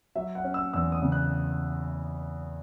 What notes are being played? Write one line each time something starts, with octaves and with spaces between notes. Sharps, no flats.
F#3 E5
F#5
C#4
E6
E2 E6
D#6
C#3
F#6